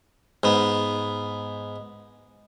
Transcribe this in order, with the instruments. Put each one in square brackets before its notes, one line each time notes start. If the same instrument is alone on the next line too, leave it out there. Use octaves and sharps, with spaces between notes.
[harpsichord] G#2 B3